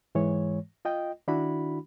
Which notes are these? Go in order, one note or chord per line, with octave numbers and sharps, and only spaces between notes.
G#2 E3 G#3 C#5
F4 D#5 G5
D#3 D4 E4 F#4 B5